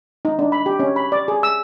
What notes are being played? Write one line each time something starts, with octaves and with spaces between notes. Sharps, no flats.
D#4
D4
B5
G4
C#4
B5
D5
G#4
E6